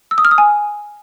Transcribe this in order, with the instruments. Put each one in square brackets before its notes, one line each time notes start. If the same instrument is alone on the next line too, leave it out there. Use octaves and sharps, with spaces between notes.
[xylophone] E6
D#6
F6
D#6
G#5